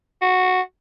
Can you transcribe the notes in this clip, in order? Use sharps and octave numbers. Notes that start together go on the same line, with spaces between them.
F#4